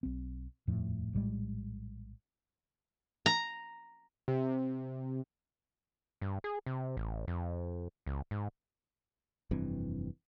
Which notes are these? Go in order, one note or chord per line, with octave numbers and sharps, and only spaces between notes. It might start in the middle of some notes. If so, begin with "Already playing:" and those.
B1 C4
D#1 F2 A2 F3
A#1 A2 G3 G#3
A#5
C3
G2
G#4
C3
A1
F2
C#2
G#2
F1 G2 E3 C4